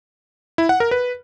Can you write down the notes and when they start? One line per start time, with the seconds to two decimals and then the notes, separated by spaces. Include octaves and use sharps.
0.58 E4
0.69 F#5
0.80 A#4
0.91 B4